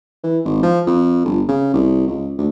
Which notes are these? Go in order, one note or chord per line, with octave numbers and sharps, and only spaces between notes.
E3
G#1
F3
F2
G1
C#3
C2
C#2
D2